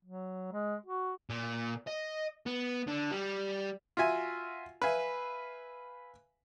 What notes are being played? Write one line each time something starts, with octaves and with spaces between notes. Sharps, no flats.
F#3
G#3
F#4
A#2
D#5
B3
D3
G3
F4 F#4 E5 G#5
B4 E5 F5 G#5